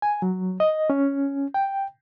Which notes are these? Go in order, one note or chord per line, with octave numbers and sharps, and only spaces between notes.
G#5
F#3
D#5
C#4
G5